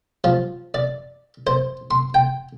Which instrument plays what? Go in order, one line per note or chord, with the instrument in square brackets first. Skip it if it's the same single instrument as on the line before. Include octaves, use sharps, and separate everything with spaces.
[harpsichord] F3
D5
C5
C6
G5